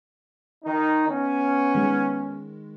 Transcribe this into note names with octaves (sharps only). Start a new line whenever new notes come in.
D#3 D#4
B3 C#4
D#3 G#3